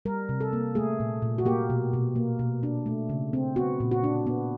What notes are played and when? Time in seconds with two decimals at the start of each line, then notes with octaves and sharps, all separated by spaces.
0.05 G3 A#4
0.29 C3
0.41 A4
0.53 A#3
0.75 A3 G#4
1.00 A#2
1.22 A#2
1.38 F#4
1.45 A#3 G4
1.70 B2
1.93 B2
2.16 A#3
2.39 B2
2.63 D4
2.86 A3
3.09 C#3
3.33 C4
3.56 B3 F#4
3.80 A#2
3.91 F#4
4.04 D4
4.27 B3